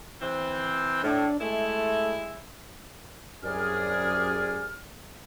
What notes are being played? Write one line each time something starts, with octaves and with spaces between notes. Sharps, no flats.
E3 C4
A2 D4
G#3 A3 E4
C2 F#2 G#4 D5 F6